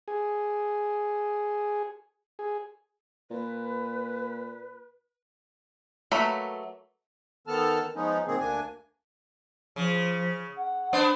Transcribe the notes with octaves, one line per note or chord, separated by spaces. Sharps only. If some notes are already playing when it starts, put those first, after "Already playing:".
G#4
G#4
A#2 B4
F#3 A3 A#3 B4 B5
D#3 B3 A4 A5 F6
F3 G#3 B3 C#4 D#4
G#2 B2 D#3 A#3 C4 G#4
D2 A#3 D4 G#5
C#3 F3
F#5
B3 C#4 D4 C5